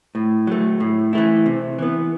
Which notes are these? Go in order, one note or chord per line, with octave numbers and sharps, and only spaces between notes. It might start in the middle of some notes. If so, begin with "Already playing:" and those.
A2
F#3 A3
A2
E3 A3 E4
C3
E3 B3